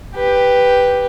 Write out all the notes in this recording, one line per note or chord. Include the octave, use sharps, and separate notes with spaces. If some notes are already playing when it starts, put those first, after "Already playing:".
G4 B4